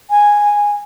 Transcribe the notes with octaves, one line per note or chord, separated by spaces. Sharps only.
G#5